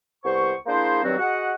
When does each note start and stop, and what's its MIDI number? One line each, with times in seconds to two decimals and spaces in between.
0.23 0.52 36
0.23 0.52 59
0.23 0.52 72
0.23 0.52 85
0.66 1.00 58
0.66 1.00 62
0.66 1.00 64
0.66 1.00 68
0.66 1.00 72
1.03 1.14 43
1.03 1.14 51
1.03 1.14 54
1.03 1.14 60
1.03 1.14 66
1.19 1.52 66
1.19 1.52 68
1.19 1.52 75
1.19 1.52 78